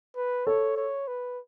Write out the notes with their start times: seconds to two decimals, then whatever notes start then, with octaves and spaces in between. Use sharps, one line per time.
0.16 B4
0.46 A4 C#5
0.77 C#5
1.08 B4